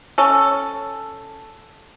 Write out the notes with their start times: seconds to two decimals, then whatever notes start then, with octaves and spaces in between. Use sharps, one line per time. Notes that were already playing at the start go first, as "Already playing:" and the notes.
0.18 C#4 A4